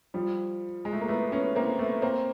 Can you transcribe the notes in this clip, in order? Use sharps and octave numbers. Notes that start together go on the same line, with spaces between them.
F3 G3
G#3
A3
A#3
A3 B3
B3 C#4
A#3 C4
A3 B3
A#3 C4